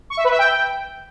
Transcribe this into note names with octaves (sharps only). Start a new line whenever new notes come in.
C#6
E5
B4
E5
G5